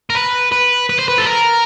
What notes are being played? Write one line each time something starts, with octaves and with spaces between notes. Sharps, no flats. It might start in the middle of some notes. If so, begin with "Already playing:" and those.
A#4
B4
B4
B4
C5
B4
A4
A#4